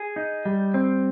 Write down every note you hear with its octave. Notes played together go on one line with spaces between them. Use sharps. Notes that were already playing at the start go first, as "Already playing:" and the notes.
Already playing: G#4
D#4
G3
C4